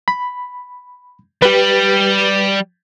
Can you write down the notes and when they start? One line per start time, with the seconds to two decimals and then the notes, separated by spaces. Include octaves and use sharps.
0.08 B5
1.42 G3 G4 B4